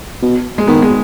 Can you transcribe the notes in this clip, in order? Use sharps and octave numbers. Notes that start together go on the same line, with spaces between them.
B2
G#3
D#3 B3
G#3